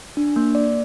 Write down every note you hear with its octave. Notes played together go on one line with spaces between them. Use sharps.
D4
A#3
D5